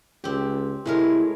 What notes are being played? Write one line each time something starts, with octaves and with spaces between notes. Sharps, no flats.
C#2 C4 G4
A2 C3 G#3 E4 A#4